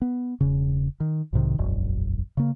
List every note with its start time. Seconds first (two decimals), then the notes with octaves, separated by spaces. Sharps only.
0.02 B3
0.40 E1 C#3
1.00 D#3
1.33 B1 G#2 C3 D#3
1.58 E1 A#1 F#2
2.37 C#3 A#3